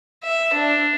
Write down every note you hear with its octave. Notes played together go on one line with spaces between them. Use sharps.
E5
D4